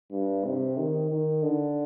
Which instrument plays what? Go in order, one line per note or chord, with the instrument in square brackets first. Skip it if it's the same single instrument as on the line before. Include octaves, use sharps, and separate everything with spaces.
[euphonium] G2
C3
D#3
D#3
D3